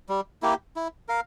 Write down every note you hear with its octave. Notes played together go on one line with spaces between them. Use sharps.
G3
A#3 E4 G4
E4
A#4 F5